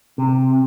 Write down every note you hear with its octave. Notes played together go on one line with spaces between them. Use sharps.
C3